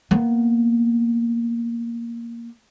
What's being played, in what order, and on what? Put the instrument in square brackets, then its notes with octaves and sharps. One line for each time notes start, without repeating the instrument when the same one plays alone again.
[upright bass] A#3 B3